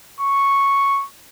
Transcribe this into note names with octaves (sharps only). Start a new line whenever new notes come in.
C#6